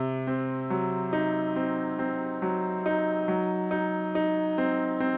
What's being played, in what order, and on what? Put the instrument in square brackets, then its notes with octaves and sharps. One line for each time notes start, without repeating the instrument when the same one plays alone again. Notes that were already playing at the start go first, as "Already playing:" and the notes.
Already playing: [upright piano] C3
C4
F#3
D#4
C4
C4
F#3
D#4
F#3
D#4
D#4
C4
C4